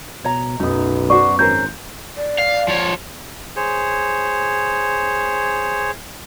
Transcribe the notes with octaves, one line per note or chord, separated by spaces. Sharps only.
B2 C#5 A#5
B1 F#2 B3 D#4 D#6
F#4 C5 D5 C#6
G#1 C#4 A#4 C5 G6
D5
F5
F3 C#5
G#4 C5 C#5